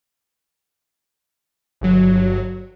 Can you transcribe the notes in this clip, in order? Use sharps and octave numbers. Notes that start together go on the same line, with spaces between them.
G1 F#3